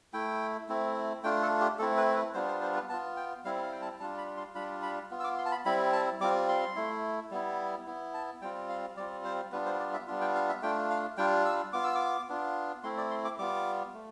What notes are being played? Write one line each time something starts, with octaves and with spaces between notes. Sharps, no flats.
A3 E4 G5
A3 C4 E4
A3 D4 F4 G5
A4
G4
A3 C4 E4 A4
B4
B4
G3 B3 D4 F4 C5
C5
C5
B4
B3 F4 A5
G5
G3 C4 E4 F5
F5
G5
A5
G3 D4 F4 A5
B5
C6
G3 D4 F4 B5
B5
B3 F4
E6
D6
C6
A5
B5
G3 C4 E4 B5
A5
G3 C4 F4 D6
C6
A3 E4
G3 B3 E4
B3 E4
A5
G3 C4 F4 G5
F5
G3 C4 F4 D5
C5
G3 B3 D4 F4 B4
C5
D5
E5
G3 B3 D4 F4
G5
F5
E5
A3 D4 F4 G5
F5
G3 D4 F4 G5
E6
B3 F4 D6
E6
D6
B3 D4 F4
A3 C4 E4 C6
D5
C6
D6
G3 B3 F4 D6
A3